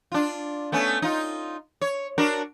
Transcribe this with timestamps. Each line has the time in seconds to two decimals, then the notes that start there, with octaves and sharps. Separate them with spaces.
0.12 D4 F4
0.72 A3 B3 C#4
1.02 D#4 F4
1.81 C#5
2.18 D4 F#4 A#4